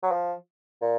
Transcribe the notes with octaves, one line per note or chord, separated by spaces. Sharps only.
F#3
F3
A#2